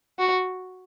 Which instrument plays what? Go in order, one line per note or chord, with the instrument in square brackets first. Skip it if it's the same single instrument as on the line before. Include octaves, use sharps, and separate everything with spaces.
[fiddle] F#4